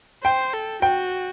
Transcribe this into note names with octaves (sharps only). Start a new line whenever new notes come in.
C5 G5
A4
F#4 G5